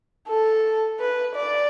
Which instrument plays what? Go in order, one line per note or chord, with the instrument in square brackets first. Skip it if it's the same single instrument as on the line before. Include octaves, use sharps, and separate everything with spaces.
[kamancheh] A4
B4
D5